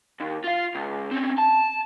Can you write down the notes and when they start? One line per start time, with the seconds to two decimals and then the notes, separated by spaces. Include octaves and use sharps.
0.20 D#2
0.44 F4 F5
0.75 C#2
1.11 C4 C#4
1.38 A5